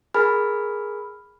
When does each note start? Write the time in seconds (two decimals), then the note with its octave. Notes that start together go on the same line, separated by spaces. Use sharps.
0.14 G#4 A#4 G#5 B5 F6